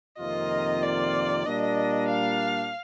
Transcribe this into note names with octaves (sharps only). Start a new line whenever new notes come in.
F2 C3 D#3 A#3 F4 D#5
D5
A#2 G3 A#3 D4 D#5
F5